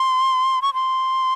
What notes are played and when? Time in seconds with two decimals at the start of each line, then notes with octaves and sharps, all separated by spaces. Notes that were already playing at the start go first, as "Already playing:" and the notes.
Already playing: C6
0.62 C#6
0.74 C6